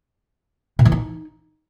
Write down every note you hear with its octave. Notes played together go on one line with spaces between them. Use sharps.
A#2
E3
D#4